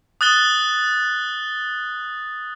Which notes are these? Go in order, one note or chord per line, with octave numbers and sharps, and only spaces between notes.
D#6 F#6 A6 G7